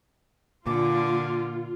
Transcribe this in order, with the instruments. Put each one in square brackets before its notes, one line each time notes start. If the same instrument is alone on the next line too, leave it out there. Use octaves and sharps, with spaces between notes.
[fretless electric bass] A#2 [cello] D3 [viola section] F4 [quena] D6